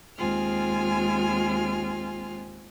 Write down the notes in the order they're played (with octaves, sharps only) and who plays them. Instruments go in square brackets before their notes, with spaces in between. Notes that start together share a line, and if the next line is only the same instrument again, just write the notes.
[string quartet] D#2 G#3 C4 F4 G#5 F6